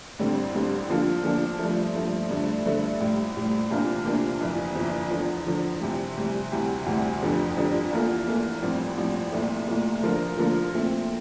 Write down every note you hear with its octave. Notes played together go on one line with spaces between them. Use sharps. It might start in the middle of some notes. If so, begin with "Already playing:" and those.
A1 G2 D3 G3 C4
A1 G2 D3 G3 C4
D3 F3 A#3 D4 F4
D3 F3 A#3 D4 F4
G2 F3 A3
G2 F3 A3
G2 D3 A3
G2 D3 A3
A#1 A2 G3
A#1 A2 G3
C3 E3 A#3 D4 F4
C3 E3 A#3 D4 F4
G1 F2 E3
G1 F2 E3
E2 D3 F3
E2 D3 F3
C3 E3 G3
C3 E3 G3
D2 C3 E3 G3
D2 C3 E3 G3
G1 F2 D3 G3
G1 F2 D3 G3
E2 E3 A#3 F4 A4
E2 E3 A#3 F4 A4
A1 G2 F3 C4
A1 G2 F3 C4
C2 A#2 A3
C2 A#2 A3
D3 F3 A#3 F4 A#4
D3 F3 A#3 F4 A#4
A#2 A3 C4